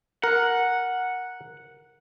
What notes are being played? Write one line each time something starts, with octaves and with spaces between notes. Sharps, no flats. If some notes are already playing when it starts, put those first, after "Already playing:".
A#4 F#5